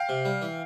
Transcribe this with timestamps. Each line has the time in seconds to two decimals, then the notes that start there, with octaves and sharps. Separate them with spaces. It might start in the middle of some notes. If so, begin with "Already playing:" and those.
Already playing: F5 G5
0.09 C3
0.25 G3
0.42 E3